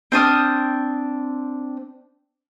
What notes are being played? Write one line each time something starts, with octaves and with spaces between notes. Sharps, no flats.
C4 D4 D#6 F6